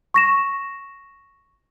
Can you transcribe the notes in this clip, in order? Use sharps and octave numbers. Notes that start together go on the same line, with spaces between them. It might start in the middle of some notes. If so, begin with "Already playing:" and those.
C#6 A#6 E7